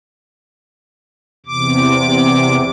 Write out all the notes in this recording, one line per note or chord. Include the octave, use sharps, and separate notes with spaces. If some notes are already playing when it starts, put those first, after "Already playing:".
E2 C3 D6